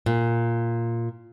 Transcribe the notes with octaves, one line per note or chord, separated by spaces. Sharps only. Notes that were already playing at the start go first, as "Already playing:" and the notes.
A#2